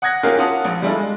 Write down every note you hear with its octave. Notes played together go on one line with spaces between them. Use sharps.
F#5 D#6 F#6 G#6 A#6
A#3 C#4 F4 G4 G#4 A#4
C#4 F4 F#5 A5 D#6
A#1
G3 G#3 D4 E4 F4 A4
G#3